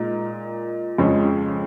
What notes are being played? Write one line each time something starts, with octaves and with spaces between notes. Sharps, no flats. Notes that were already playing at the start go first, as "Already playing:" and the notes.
Already playing: A#2 G#3 D#4 A#4
F2 C#3 F3 G#3 C#4